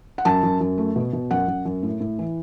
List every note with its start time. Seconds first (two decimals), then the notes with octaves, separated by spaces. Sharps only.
0.18 F#5
0.25 F#2 A5
0.43 F#2
0.60 F#2
0.78 A3
0.96 B2
1.13 B2
1.31 F#2 F#5
1.48 F#2
1.65 F#2
1.83 A2
2.00 A2
2.19 E3